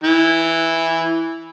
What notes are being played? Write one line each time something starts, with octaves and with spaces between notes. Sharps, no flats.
E3